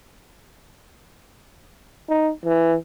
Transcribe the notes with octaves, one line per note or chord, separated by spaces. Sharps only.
D#4
E3